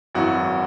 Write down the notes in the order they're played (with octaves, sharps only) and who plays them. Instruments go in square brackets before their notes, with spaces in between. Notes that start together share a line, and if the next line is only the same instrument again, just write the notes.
[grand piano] G#1 F#2 E3 F#4